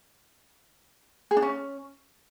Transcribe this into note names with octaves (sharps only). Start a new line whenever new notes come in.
G#4
D4
C#4